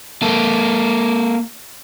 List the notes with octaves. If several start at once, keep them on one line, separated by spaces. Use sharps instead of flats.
A#3 A4